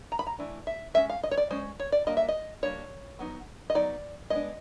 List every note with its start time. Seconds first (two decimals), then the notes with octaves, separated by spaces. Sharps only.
0.12 A#5
0.19 B5
0.27 A#5
0.39 E3 A3 D4
0.67 E5
0.94 G#3 C#4 E5
1.10 F5
1.23 D#5
1.31 C#5
1.37 D5
1.51 G#3 C#4 C5
1.80 C#5
1.92 D5
2.07 G3 A#3 D4 D#5
2.17 E5
2.28 D#5
2.63 G3 A#3 D4 C#5
3.19 F#3 B3 D#4
3.70 D#5
3.75 F#3 B3 D#4 D5
4.30 G#3 B3 D4 D#5